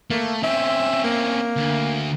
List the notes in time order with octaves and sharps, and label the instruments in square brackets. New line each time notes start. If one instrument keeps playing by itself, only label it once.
[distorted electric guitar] A3 [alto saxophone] A#3
[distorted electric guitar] C4 C#4 [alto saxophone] E5
[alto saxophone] A#3
[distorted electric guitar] D2